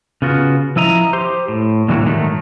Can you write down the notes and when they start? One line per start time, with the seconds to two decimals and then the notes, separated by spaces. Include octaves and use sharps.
0.22 C#3 B3 F4 F#4
0.76 F3 E4 D#5 A#5
1.13 G4 C5
1.48 A2
1.88 A#2 D3 E3 F#3 G3 F#4
2.05 G#2 D#3 F#3 A3